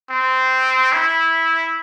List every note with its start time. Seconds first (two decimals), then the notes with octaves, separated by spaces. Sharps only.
0.10 C4
0.93 E4